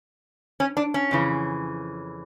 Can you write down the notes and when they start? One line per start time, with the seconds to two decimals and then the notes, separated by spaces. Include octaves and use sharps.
0.60 C#4
0.77 D4
0.94 C#4
1.11 F2 C#3 E3